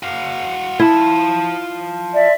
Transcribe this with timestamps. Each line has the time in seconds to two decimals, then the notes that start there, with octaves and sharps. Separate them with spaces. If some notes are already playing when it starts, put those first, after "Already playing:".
0.03 F#4 F5
0.80 E4 F4 A5
2.13 D5 E5